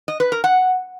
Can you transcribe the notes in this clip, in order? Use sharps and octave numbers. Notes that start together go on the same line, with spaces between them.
D#5
B4
A#4
F#5